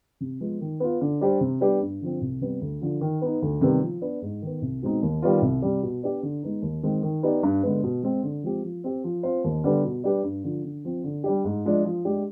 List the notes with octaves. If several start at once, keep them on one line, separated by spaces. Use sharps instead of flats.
C3
F3 G#3 B3
D#3
B3 F4
D3
G3 D4 G4 C5
C3
G3 B3 D4 G4
G2
D3 F3 C4
C2
C3 G3 B3
D2
D3 F3
D#3
B3 D#4
D2
C3 D#3 G3 B3
F3
B3 D4
G#2
D#3 B3
C2
B2 G#3 C4 D#4
D#2
D#3 G3 B3 F4
C2
C3 G3
B2
B3 D4 G4 D5
D3
G#3 B3 D#4
D#2
D#3 G#3 C4
D#3
B3 D#4 G4 D5
G2
D3 G#3 B3
B2
G#3 C4
D3
F3 G#3 C4 G4
F3
C4 G4
F3
C4 F4 C5
D#2
D3 G3 B3
B2
G3 D4 G4 B4
G2
D3 F3
D3
F3 C4
D3
G3 D4 G4
G#2
F3 G#3 D4
F3
G#3 D4 G4